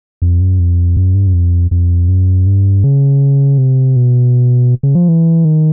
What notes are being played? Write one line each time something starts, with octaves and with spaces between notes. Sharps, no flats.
F2
F#2
F2
F#2
G2
F#2
F2
F2
F#2
G2
C#3
C3
B2
C#3
F3
E3
D#3